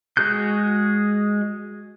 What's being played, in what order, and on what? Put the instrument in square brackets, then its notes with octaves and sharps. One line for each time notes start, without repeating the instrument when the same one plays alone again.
[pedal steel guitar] G#3 F#4 G#4 F#6 G6